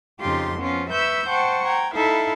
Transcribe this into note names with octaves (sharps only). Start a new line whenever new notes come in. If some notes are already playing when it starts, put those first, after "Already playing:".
F2 C#3 D#4 F4 G4 C6
F3 B3 C#4 F4
B4 E5 B5 C#6 E6 G6
C5 F#5 G5 A5 C#6
G5 A#5 G#6
D#4 E4 A4 E5 F5 B5